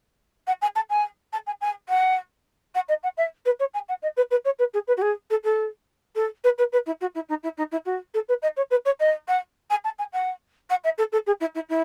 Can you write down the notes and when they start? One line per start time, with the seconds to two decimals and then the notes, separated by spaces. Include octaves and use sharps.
0.47 F#5
0.61 G#5
0.75 A5
0.89 G#5
1.32 A5
1.46 G#5
1.61 G#5
1.89 F#5
2.74 F#5
2.88 D#5
3.03 F#5
3.17 E5
3.45 B4
3.59 C#5
3.73 G#5
3.88 F#5
4.02 D#5
4.16 B4
4.31 B4
4.44 C#5
4.59 B4
4.73 G#4
4.87 B4
4.97 F#4
5.01 G#4
5.30 A4
5.44 A4
6.15 A4
6.44 B4
6.58 B4
6.72 B4
6.86 E4
7.01 F#4
7.15 E4
7.29 D#4
7.43 E4
7.57 D#4
7.71 E4
7.85 F#4
8.14 A4
8.28 B4
8.42 D#5
8.56 C#5
8.70 B4
8.85 C#5
8.99 D#5
9.28 F#5
9.70 G#5
9.84 A5
9.98 G#5
10.13 F#5
10.70 F#5
10.84 E5
10.98 A4
11.12 A4
11.26 G#4
11.40 E4
11.54 E4
11.69 E4